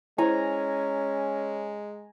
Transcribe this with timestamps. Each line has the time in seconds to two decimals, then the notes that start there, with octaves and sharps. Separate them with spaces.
0.18 G#3 C#4 E4 C5 G#5 A#5